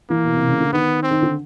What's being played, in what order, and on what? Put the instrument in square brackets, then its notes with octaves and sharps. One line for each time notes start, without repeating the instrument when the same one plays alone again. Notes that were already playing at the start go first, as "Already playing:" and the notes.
[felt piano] E3 [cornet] A#3
[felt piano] B2
C3
C#3
D3
[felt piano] D#3 [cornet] B3
[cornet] C4
[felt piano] D#3
D3